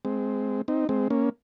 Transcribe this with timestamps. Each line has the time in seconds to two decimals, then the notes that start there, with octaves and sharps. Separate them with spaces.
0.05 G#3 C4
0.68 C4 D#4
0.89 G#3 C4
1.10 A#3 C#4